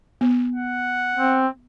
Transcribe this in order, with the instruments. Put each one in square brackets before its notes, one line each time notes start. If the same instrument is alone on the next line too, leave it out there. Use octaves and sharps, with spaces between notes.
[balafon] B3
[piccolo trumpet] F#5
[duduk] C4